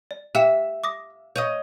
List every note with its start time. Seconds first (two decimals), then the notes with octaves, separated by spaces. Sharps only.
0.11 D5
0.35 G4 E5 G5
0.84 D6 D#6 A#6
1.36 C#5 D#5 G6 D#7